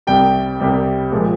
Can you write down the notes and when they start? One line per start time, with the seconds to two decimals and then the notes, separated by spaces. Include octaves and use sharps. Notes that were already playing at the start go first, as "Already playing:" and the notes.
0.07 C2 C3 G3 G5
0.60 C2 C3 G3
1.12 A#2 F3 G#3